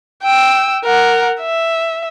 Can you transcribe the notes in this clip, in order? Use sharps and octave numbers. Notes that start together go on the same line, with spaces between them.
G5 E6
A#4 F#5
E5